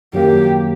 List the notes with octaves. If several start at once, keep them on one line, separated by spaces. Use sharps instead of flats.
F#2 D#3 F#3 A#3 G4